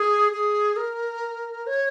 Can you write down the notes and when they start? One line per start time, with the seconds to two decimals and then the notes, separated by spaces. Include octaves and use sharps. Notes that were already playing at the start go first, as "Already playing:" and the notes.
Already playing: G#4
0.32 G#4
0.76 A#4
1.67 C#5